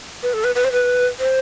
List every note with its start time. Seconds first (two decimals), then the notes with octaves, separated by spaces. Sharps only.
0.23 B4
0.33 A4
0.44 B4
0.55 B4
0.64 C5
0.72 B4
1.20 C5